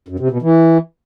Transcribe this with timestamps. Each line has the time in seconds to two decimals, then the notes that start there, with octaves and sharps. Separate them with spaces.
0.08 F#2
0.20 C3
0.31 B2
0.42 E3